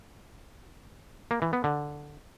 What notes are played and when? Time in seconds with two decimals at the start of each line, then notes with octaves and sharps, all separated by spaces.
1.31 A#3
1.42 E3
1.53 B3
1.64 D3